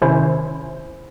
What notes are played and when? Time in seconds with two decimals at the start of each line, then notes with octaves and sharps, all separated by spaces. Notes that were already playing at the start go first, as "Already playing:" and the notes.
0.02 C3 D#3 C#4 E4 C5